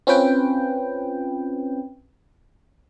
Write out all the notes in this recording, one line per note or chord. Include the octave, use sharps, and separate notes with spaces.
C4 C#4 F4 B4 G5